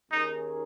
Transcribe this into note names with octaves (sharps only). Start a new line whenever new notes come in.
D#2 D#3 A#3 C#4 D#4 G#4